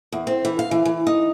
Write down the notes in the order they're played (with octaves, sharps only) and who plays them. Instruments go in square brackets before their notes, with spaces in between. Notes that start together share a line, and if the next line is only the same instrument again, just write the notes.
[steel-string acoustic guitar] E2
C4
E3
F5
E3
E3
D#4